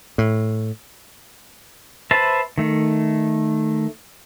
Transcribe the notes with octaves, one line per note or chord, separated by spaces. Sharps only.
A2
B4 C5 E5 A5
D#3 A3